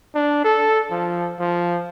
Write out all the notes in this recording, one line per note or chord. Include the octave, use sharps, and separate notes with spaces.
D4
A4
F3
F3